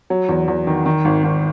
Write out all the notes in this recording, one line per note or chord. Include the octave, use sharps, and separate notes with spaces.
F#3
E2
E2
D#3
D#3
G#1
G#1